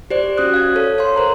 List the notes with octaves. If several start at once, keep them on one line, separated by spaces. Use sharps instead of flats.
G4 C5 D5
C#4 F#4 D#6 F#6
F5 G#6
A4 C#5
C#5 F5 C6
A#4 C5 A#5